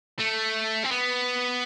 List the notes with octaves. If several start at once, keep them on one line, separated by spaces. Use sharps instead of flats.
A3
C4
B3